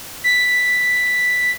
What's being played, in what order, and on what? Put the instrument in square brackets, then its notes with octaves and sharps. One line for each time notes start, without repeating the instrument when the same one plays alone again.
[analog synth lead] B6